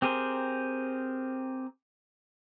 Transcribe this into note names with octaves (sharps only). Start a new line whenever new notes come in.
C4 G4 G#4 A#4 C5